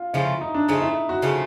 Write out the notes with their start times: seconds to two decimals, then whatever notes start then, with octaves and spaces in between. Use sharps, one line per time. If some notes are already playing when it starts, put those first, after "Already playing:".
Already playing: F4
0.13 C#3 F3 A3 E4
0.41 D#4
0.54 D4
0.68 C#3 F3 A3 D#4
0.82 E4
1.09 F#4
1.22 C#3 F3 A3